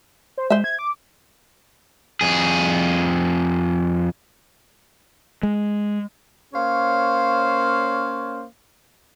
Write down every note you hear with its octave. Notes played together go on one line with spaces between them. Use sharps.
C5
G#3 C5 E5
G#6
D6
F2 G#4
G#3
A#3 C#4 C5 C#5 F5